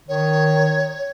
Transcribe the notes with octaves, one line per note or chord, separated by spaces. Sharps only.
D#3 C#5